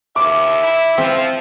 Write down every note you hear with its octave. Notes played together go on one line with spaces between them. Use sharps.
D#2 E5 D6
E4
F3 C4